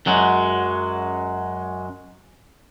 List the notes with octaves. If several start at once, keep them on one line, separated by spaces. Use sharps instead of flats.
F#2 F#3 G#3